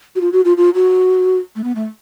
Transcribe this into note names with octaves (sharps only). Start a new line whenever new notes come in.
F#4
F4
F#4
F4
F4
F#4
A3
B3
A3